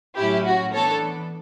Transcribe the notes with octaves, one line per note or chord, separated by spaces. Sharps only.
A2 F#3 C#4 E4 G4
F#4
E3 B3 D4 A4 C#5